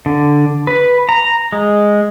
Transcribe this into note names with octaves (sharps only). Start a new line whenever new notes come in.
D3
B4
A#5
G#3